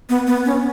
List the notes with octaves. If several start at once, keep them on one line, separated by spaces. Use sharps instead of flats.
B3
B3
C#4